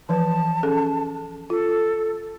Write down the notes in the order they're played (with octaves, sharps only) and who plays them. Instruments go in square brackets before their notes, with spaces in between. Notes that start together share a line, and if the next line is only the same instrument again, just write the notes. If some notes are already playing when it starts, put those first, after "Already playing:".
[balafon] E3 F3 B4 [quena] A5
[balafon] C#4 G#4 A4
[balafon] F4 [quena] A4